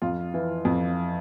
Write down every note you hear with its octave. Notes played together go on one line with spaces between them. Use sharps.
F2 F4
E3
F2